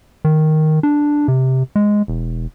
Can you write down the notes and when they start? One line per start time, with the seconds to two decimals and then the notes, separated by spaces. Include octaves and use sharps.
0.25 D#3
0.83 D4
1.28 C3
1.76 G#3
2.08 E1